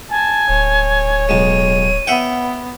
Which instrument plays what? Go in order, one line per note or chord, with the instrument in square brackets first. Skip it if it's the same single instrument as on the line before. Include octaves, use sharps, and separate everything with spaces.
[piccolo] G#5 [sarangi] A5
[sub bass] D1 [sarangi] C#5
[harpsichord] B1 G#3 [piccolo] D#7
[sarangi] B3 [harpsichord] E5 F#5 G5